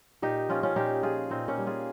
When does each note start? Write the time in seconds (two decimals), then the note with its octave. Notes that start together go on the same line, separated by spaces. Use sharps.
0.22 A#2 D#4 G4
0.49 F3 C#4 F4
0.63 C#4 F4
0.76 A#2 D#4 G4
1.03 F3 F4 G#4
1.30 A#2 C4 D#4
1.48 A#3 C#4
1.58 G3
1.67 F4 G#4